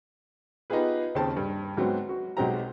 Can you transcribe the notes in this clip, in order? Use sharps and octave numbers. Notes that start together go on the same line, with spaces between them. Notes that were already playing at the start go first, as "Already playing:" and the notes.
B3 D#4 F4 G4 G#4 B4
D#2 C#3 C4 C5 A5
G2
G#2 F#3 B3 C4
F#4
B1 F#3 G#3 C4 G4 A#5